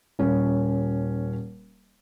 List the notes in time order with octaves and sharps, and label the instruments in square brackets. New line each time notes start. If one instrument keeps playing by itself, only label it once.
[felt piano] D#1 C#4